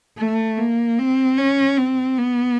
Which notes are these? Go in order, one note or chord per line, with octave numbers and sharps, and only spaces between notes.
A3
A#3
C4
C#4
C4
B3